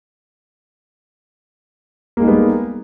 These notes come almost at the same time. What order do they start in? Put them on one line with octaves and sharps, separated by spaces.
A#3 G#3 D#4 G3 B3